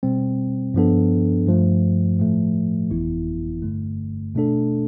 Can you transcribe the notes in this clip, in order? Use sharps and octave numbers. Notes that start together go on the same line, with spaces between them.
B2 G3 C4
G2 F3 B3 D4 A4
G2 F3 A3
A2 F3 A3
G1 F2 E3 B3 E4
G2 D3 A3
B2 A3 D4 A4